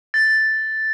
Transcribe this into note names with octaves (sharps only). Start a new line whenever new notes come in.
A6